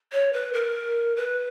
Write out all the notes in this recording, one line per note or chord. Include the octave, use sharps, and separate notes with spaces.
C#5
B4
A#4
B4